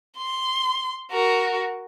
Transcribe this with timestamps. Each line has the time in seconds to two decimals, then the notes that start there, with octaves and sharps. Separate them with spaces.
0.17 C6
1.12 F#4 A#4